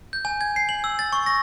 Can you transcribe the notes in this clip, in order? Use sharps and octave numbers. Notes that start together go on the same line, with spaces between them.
G6
G#5
G#6
C7
F#7
E6
A6
C#6
A#6